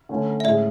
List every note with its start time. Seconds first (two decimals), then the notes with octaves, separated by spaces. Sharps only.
0.09 D3 A3 C#4
0.40 E5
0.44 A2 G#3 C#4 G#4 D5